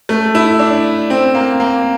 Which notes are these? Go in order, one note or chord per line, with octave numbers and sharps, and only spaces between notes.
A3
E4
D4
C4
A#3
A#3